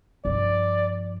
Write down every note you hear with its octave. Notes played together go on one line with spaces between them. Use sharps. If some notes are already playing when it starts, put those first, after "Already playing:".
G2 F3 D5